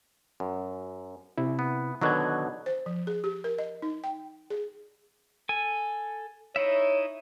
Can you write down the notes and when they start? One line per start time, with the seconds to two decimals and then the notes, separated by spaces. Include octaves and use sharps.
0.40 F#2
1.38 C3 E4
1.59 B3
2.01 B2 D3 D#3 F#3 F#6 G#6
2.66 C5
2.86 F3
3.07 G#4
3.24 G4
3.44 A#4
3.58 D#5
3.82 D#4
4.04 G5
4.50 G#4
5.49 A4 G#5
6.56 D#4 E4 C#5 E5